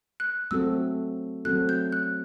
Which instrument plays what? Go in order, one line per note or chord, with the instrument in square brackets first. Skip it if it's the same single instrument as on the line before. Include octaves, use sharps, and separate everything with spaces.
[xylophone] F#6
[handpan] F#3 A3 C4 F#4 A4 [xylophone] E6
[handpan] F#3 A3 C4 F#4 A4 [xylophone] F#6
[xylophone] G6
F#6